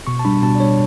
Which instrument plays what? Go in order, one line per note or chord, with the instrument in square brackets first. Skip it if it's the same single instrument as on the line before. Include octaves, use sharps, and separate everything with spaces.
[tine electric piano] B2 C#6
A5
G3 D4 B5
B2 A5
D5
G3 D4 C#5